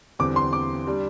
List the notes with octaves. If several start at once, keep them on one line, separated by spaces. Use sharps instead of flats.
E2 D3 G3 C4 D6
C6
D6
G3 D4